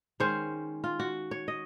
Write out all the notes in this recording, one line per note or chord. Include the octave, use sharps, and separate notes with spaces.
D#3 G#3 C#4 C5
F4
F#4
C#5
D#5